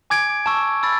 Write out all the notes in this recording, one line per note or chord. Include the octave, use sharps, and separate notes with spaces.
G#5 D6 G#6 D7
A5 C#6 E6
B5 E6 A6